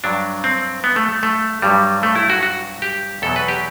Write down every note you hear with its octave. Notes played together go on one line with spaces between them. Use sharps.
G2 F#3 D4
C4
B3
A3
A3
G2 F#3 G3
A3
E4
F#4
F#4
G4
E2 B2 F#3 A4
B4
G4